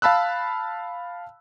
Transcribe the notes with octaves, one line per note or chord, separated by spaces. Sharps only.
F5 A5 B5 E6 F#6